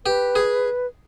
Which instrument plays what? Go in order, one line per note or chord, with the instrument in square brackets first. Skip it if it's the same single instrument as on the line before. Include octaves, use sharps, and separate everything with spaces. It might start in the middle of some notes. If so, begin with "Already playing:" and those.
[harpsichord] G4 [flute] B4
[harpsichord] G#4